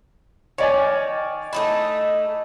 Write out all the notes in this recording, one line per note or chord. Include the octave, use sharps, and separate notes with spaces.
D#3 C#5 D5 G#5
A3 D#4 E4